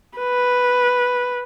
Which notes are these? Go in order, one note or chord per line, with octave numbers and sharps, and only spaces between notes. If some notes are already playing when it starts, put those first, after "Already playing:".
B4